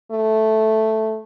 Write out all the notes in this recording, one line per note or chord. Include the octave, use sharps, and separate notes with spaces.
A3